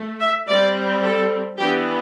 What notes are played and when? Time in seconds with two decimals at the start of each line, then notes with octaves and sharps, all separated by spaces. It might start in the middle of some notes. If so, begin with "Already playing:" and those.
Already playing: A3
0.20 E5
0.47 G3 C4 D5
1.03 A4
1.59 E3 B3 D4 G4